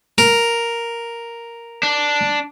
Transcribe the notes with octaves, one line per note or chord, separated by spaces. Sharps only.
A#4
D4